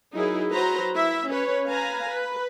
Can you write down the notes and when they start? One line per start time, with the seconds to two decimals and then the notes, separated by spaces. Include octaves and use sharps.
0.13 F#3 D#4 E4 G#4 A#4
0.52 F#3 F#4 B4 C5 A#5
0.94 E4 E5
1.28 C#4 B4 C#5
1.67 B4 F5 G#5 A#5
2.08 B4